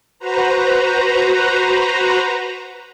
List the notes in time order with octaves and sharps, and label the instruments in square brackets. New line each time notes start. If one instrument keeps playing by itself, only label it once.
[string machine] F#4 B4 C5 A#5